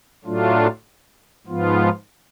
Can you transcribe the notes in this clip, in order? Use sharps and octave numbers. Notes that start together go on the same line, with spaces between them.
A2 F#3 A3 D4 F4
G#2 F3 B3 F4